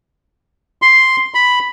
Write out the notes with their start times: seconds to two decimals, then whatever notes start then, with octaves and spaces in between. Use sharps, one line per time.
0.82 C6
1.34 B5